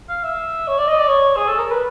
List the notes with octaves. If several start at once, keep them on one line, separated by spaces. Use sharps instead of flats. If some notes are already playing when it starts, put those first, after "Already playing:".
F5
E5
C#5
D5
D#5
D5
C#5
G#4
A4
A#4
B4